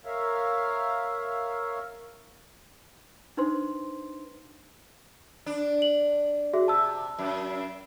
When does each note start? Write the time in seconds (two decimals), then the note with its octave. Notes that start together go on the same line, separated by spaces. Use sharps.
0.05 A#4 C#5 E5 F5
3.37 D4 D#4 B4 C5 C6
5.46 D4
5.82 F#7
6.53 F#4 G#4 E5
6.68 C3 A5 E6
7.18 F#2